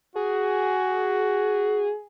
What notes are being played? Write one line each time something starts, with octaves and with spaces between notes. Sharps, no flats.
F#4 G#4